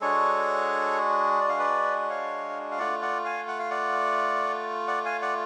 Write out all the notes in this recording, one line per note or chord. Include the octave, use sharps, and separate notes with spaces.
G#3 D4 F#4 A4 C#5
D5
F5
B4 D5
C#5 F5
F5
A3 F4 D5 F#5
D5 F#5
F5 G#5
F#5
F5
D5 F#5
D5 F#5
F5 G#5
D5 F#5